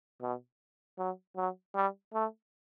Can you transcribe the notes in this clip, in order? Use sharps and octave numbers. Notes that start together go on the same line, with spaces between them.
B2
F#3
F#3
G3
A3